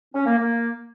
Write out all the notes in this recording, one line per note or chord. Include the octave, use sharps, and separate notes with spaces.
C#4
A#3
A#3